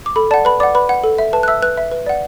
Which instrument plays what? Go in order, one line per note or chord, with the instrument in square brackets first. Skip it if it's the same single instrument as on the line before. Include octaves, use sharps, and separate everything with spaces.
[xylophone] D6
A4 B5
D5 F#5 A5
B4 B5
D5 F#5 D6
B4 B5
F#5
A4
E5
B4 A5
F#6
E5 E6
B4 F#6
E5
B4
D5 F#5